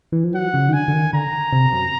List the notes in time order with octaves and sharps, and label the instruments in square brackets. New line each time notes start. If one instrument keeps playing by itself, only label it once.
[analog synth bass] E3
F3
[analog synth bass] F#3 [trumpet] F#5
[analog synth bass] C#3
D#3
[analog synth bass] D3 [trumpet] G#5
[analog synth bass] D3
D#3
[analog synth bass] D3 [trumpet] A#5
[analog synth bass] C3
F#2